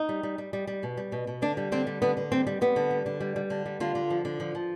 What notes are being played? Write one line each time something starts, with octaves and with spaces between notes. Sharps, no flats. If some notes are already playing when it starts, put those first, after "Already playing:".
Already playing: D#4
G3
G3
G3
G3
G3
B2
G3
B2
B2
D3 D4
G3
D3 C4
G3
D3 B3
D3
G3 C4
G3
G3 B3
D3
G3
D3
G3
G3
D3
G3
D3 F4
D3
F3
D3
F3
F3